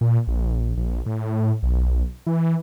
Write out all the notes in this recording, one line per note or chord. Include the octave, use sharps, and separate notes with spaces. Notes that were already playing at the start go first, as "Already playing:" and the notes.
A#2
A#1
A#1
A2
B1
E3